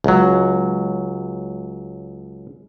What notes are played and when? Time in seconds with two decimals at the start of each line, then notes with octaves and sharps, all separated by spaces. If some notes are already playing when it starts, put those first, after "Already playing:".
0.04 C#2 F#3